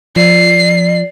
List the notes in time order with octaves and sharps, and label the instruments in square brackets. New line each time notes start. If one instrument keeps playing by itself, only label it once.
[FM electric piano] F3 [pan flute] D5 [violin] C7